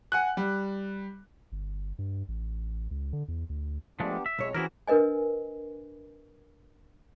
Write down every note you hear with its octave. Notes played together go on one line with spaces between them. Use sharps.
F#5 G#5 F#6
G3
G1
G2
A1
C#2
D3
E2
D2
F3 G#3 A3 B3 D4 G4
E5
B1 F2 G#3 C#5
E3 C4 C#4 E4 F#4 G#4 A#4
D4 A#4 B4 D#5 G#5